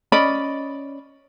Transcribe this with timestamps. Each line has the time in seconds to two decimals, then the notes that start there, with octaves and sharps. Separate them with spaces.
0.12 C#4 D5 D#5 B5